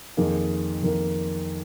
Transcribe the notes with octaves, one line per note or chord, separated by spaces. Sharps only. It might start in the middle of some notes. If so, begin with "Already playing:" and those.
F2 D#3 A#3 G#4
F2 D#3 A#3 A#4